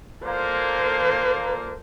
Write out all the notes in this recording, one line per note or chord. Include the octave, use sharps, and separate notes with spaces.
A#2 A#3 A4 C5